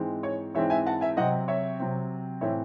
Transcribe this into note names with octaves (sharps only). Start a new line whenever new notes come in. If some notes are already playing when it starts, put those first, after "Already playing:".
Already playing: G#2 E3 G#3 C4
C#5
G#2 E3 G#3 C4 C#5 E5
E5 G#5
F#5 A5
E5 G#5
C3 F#3 C4 D#5 F#5
C#5 E5
C3 F#3 C4
A2 E3 C4 C#5 E5